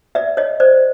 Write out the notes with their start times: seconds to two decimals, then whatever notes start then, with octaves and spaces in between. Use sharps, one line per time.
0.15 D5 E5
0.37 C#5 D#5
0.60 C5 D5